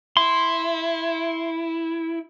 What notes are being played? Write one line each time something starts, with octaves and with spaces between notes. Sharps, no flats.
E4 C6